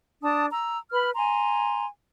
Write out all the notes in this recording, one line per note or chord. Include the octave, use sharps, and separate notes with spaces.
D4 A5 D#6
A#5 E6
B4 B5 F6
G#5 A#5 C6